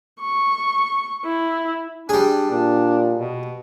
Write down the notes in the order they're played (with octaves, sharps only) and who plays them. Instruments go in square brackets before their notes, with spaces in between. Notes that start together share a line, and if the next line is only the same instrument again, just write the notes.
[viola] C#6
E4
[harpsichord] G3 G#4 [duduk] D4
[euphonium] A#2 [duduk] D4
[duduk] B2